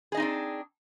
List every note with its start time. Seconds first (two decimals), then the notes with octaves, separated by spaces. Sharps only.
0.12 G#4
0.15 D#5
0.17 D#4
0.20 C4
0.22 D4